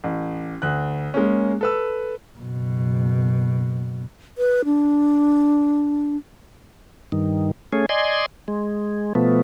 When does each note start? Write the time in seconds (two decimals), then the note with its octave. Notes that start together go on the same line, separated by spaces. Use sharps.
0.04 A1
0.62 D2 F#6
1.14 G#3 A#3 C#4
1.61 A4 B4 E6
2.37 F#1 B2
4.38 B4
4.65 D4
7.12 G2 D#3
7.73 A3 C#4 G#4
7.89 D5 D#5 G#5 C6
8.48 G#3
9.15 B2 F3 A3 B3